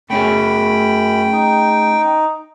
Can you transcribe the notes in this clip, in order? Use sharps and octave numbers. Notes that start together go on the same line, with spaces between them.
F#2 A3 C#4 G#4 G5 B5
D#4